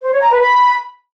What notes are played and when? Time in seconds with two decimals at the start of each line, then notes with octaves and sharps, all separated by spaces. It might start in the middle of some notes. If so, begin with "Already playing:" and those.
0.03 C5
0.12 C#5
0.22 A#5
0.32 B4
0.41 B5